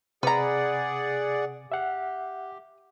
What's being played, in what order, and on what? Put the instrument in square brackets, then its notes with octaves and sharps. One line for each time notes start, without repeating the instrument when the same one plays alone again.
[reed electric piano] C3 [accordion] G#4 D5 F#5 [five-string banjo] B4 A#5
[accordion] G4 [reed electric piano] E5 F#5